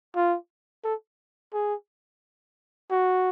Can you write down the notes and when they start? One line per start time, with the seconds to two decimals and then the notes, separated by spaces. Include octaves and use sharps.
0.16 F4
0.84 A4
1.53 G#4
2.91 F#4